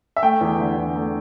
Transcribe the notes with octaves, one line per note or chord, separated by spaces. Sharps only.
E5
A3 G5
E2
D3
E2
A3